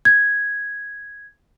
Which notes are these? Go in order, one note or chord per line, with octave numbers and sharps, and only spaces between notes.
G#6